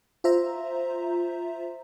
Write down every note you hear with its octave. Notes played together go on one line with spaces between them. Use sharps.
F4 C5 E5 A#5